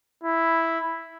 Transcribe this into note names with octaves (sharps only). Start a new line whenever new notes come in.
E4